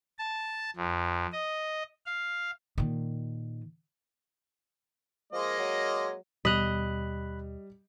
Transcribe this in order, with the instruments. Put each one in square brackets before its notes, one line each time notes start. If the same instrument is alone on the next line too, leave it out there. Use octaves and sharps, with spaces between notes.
[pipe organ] A5
F2
D#5
F5
[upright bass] A#2 D#3
[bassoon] F3 [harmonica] G#3 A#3 D#5
[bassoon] F#3
[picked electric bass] D#2 B2 B3 [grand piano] G3 F7 [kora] D#5 [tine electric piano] B5 F#6